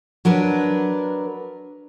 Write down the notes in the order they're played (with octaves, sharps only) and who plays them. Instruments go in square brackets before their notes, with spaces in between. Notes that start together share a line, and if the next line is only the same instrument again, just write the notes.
[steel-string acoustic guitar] F#3 D4 A#4 B4